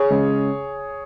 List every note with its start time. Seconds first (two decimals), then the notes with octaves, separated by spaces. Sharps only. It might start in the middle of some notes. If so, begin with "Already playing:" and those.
Already playing: G#4 C#5
0.11 C#3 G#3